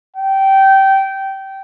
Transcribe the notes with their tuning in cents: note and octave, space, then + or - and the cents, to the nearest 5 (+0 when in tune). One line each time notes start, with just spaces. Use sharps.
G5 -20